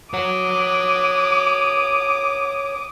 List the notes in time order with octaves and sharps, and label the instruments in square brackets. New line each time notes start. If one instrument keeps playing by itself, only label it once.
[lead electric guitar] C#5 F#5 [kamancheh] D6 D#6